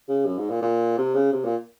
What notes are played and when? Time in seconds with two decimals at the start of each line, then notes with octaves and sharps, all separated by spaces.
0.08 C#3
0.26 F#2
0.38 G#2
0.50 A#2
0.62 A#2
0.98 C3
1.15 C#3
1.33 C3
1.45 A#2